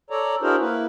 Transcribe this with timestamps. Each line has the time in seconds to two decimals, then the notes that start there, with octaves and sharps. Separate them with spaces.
0.10 A4 C#5 D5 A#5
0.42 D4 E4 F#4 G#4 A#4 C5
0.61 A#3 E4 B4